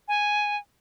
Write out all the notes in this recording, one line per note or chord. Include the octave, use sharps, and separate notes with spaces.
G#5